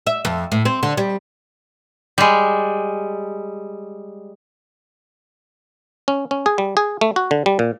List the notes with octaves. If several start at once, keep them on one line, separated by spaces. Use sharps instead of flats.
E5
F2
A2
C4
D3
G3
G3 G#3
C#4
C#4
G#4
G3
G#4
A3
F#4
D3
G3
A#2